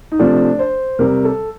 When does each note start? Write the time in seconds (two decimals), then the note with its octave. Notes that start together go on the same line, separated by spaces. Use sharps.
0.12 D#4
0.19 C3 F3 A3 D4
0.59 C5
0.99 C3 G3 A#4
1.25 A4